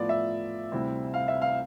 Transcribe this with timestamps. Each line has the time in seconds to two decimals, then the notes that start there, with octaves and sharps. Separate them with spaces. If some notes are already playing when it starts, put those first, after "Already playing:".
Already playing: A2 F3 B3 F4 D5
0.09 E5
0.72 D2 C3 G3 C4 E4
1.14 F5
1.28 E5
1.42 F5